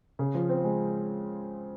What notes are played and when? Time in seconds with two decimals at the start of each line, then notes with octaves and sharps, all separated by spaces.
0.19 C#3
0.35 F3
0.49 C4
0.64 G#3